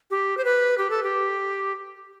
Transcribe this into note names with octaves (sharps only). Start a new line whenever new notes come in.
G4
C5
B4
G4
A4
G4